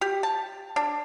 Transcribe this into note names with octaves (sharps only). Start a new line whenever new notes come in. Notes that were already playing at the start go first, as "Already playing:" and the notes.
G4
A5
D4